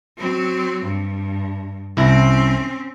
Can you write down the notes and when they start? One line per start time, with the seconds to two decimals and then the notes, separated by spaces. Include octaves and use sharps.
0.18 F#3 C4
0.85 G2
1.97 C2 C4 C#4 E4 A#5